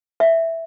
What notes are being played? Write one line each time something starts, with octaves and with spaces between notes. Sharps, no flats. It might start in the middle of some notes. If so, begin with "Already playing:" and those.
E5